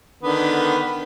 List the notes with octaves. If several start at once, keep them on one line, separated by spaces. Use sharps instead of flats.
D3 D#3 B3